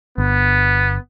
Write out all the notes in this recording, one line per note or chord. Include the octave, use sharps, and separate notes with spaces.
G1 B3